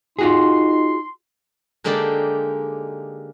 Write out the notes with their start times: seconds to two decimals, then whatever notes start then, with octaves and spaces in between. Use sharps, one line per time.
0.19 D#4 F4 F#4 G#4 C6
1.84 D3 G#3 A#3 D#4 G4 D5